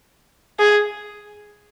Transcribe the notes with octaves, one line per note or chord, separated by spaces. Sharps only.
G#4